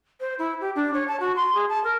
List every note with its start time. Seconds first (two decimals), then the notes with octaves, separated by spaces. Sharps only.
0.20 C5
0.39 E4
0.61 G4
0.76 D4
0.94 C#5
1.08 A5
1.20 F#4
1.36 C6
1.55 G#4
1.69 A5
1.84 A#4